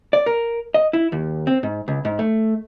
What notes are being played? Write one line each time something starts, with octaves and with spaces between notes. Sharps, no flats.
D5
A#4
D#5
E4
D#2
C4
G#2
C#2
G#2
A3